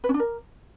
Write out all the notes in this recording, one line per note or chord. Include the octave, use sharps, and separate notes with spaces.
B4
C#4
D4
A#4